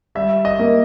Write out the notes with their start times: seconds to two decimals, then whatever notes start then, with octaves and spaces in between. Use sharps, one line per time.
0.15 G3 E5
0.45 D#5
0.60 A#3